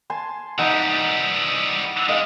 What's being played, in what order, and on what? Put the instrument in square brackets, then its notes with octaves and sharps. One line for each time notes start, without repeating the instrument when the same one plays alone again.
[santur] G#5 A5 C6
[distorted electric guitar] E3 G3 [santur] D#4 F#5
[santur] F#5
[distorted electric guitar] G#2 G#3 [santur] D#5 F5